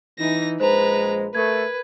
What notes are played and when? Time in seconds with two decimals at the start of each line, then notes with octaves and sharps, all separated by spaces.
0.19 E3 D#4 A#6
0.60 A#1 G#3 B4 C5 A#5
1.35 A3 A#4 B4 G#6